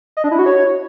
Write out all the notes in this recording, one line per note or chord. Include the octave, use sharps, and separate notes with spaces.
D#5
D4
E4
F#4
C#5